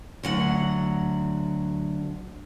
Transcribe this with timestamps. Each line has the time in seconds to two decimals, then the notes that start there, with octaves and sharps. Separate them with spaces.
0.23 D2 F#3 F#5